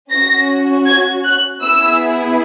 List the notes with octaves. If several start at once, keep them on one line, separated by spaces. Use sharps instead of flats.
C#4 F#4 A#6
G#6
F#6
B3 E4 G#4 E6